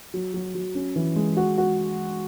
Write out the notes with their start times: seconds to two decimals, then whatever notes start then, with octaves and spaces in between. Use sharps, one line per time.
0.14 F#3
0.34 F#3
0.55 F#3
0.75 C#4
0.96 E3
1.16 G#3
1.37 F#4
1.58 F#4